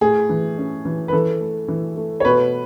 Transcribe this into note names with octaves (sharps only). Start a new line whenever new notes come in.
A2 G#4
E3
C#4
E3
B4
E3 A4
A3
E3
A3
C#5
B2 B4